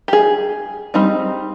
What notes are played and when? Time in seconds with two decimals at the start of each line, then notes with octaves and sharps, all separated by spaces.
0.08 G4
0.13 G#4
0.94 G3 C4 D#4